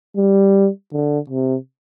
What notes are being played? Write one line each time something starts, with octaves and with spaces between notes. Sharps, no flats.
G3
D3
C3